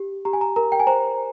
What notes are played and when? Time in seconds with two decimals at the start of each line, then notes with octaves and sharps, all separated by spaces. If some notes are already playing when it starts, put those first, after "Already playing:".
Already playing: G4
0.25 G4 A#5
0.33 G#5
0.41 A#5
0.56 A#4 A#5
0.72 G5
0.80 G#5
0.87 C5 A#5